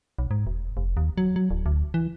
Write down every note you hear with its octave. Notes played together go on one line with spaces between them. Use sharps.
B1
G#2
E1
F1
D#2
F#3
F#3
D1
D2
E3